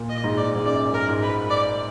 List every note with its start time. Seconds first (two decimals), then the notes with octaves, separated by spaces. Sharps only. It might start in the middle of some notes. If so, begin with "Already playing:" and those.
Already playing: A#2
0.10 D#5
0.24 G#2
0.37 D5
0.56 G#2
0.66 F#2 D5
0.94 A#4
1.09 G#2
1.22 B4
1.50 D5